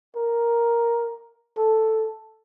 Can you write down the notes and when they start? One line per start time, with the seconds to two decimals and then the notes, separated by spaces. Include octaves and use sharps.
0.17 A#4
1.58 A4